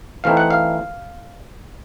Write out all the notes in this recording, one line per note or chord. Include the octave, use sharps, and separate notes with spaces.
E3 A3 C4 D#4 F5
F#5
F5